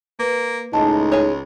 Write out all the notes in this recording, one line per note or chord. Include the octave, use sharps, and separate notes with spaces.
A#3 B4
C#2 A2 G#3 D#4 D#5 A5
G#4 C#5